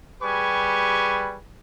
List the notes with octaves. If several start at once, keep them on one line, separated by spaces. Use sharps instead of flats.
G3 G4 G#4 B4 G#5 C#6